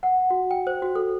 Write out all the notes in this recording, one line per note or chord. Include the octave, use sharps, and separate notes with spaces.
F#5
F#4
G5
C5
F#4
A4